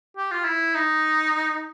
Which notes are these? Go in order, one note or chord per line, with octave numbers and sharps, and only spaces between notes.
G4
F4
E4
D#4